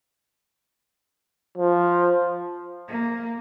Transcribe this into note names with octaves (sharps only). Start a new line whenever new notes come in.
F3
A#3